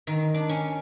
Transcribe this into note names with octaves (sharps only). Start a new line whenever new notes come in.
D#3
D4
C#4